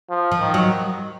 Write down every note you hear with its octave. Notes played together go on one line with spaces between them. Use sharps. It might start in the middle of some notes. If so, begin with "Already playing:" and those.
F3
F3
D#3
F#3